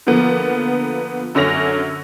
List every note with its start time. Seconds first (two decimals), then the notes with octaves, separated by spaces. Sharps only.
0.07 D3 F3 A#3 B3
1.35 F#2 D3 C#4 A#6 F7